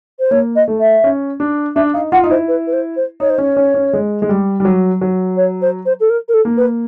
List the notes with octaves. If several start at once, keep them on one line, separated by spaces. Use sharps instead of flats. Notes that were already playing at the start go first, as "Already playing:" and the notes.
C5
A#3 C#5
D#5
A3
E5
C#4
D4
D4 E5
D#4 F5
F4 F#5
D#4
E4 C5
B4
B4
C5
C5
D#4 C#5
C5
C#4 C#5
C#4
C#4
G#3
G#3
G3
G3
F#3
F#3
C#5
C5
C5
A4
A#4
A#4
A4
A#3
B4